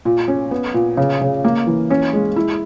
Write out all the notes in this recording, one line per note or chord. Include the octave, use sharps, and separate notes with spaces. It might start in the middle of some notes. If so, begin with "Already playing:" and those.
A#2
C#4
B3
A#2
C#3
C#3
A#3
E3
C#4
G#3
E4